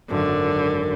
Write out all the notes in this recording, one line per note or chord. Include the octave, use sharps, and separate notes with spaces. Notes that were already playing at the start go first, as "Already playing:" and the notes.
G#1 F#2 D3